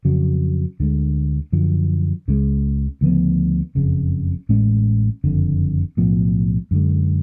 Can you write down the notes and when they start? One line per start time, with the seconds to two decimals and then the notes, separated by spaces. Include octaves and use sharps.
0.05 F2 C#3 F#3
0.80 D2 D3 G#3
1.52 F#2 D3 F3
2.28 C#2 C#3 G#3
3.01 D2 C#3 F3 B3
3.75 F#1 F2 C#3
4.49 A1 A2 G#3 C#4
5.24 F#1 F2 D3
5.97 B1 A2 F3 B3
6.71 F#2 D3 G#3